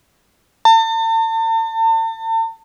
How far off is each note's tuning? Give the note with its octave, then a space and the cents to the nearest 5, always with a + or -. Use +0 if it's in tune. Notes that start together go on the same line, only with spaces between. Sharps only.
A5 +40